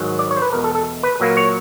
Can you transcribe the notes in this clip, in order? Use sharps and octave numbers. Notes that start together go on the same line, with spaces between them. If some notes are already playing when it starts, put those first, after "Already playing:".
Already playing: G#2 D#3 F#3
D5
C#5
C5
B4
E2 B2 G#3 A#4
A4
A4
B4
A#2 F#3 A#3
C#5